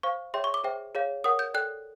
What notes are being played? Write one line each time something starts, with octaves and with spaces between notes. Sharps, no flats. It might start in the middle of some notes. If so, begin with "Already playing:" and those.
C5 F5 C#6
G#4 C#5 E5 G5 C6
C#6
D6
G#4 C5 E5 G5
G#4 C#5 F5
A#4 C#5 F#5 D#6
G6
A4 D5 G5 F#6